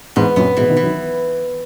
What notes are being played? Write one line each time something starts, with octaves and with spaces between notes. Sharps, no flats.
E2 G#2 B3
F#2 A#2 B3
G#2 B2 E3
B2 D#3
E3
D#3 F#3